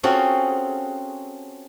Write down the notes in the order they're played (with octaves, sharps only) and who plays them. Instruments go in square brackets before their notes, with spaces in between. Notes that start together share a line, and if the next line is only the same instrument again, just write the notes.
[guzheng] C4 C#4 F4 F#4 G#4 A4